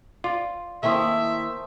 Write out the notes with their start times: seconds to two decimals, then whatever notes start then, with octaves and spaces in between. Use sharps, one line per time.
0.24 F4 D5
0.83 D#3 A3 A#3 C4 E4 E5 D#6